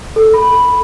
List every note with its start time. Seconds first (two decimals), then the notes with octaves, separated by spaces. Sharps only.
0.16 A4
0.34 B5